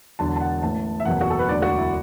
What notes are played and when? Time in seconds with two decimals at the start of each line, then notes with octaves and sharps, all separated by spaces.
0.19 E1 E2 D3 F#3 A5
0.36 A5
0.41 F#5
0.62 A1 A2 E3 A5
1.00 E5
1.05 F#1 E2 B2 F#3 F#5
1.21 F#4
1.30 A4
1.39 B4
1.48 E1 D2 D3 F#3 D5
1.62 F#4
1.77 E4